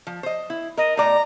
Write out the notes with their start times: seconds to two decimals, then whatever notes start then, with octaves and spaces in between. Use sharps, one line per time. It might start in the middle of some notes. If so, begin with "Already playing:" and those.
0.07 F3
0.23 C5 D#5
0.50 E4
0.77 A#4 D#5
0.97 A2 D5 A#5